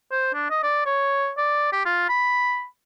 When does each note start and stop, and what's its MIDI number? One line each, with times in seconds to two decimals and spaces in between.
0.11 0.32 72
0.34 0.46 62
0.50 0.59 75
0.63 0.82 74
0.86 1.31 73
1.38 1.71 74
1.73 1.83 67
1.86 2.05 65
2.09 2.65 83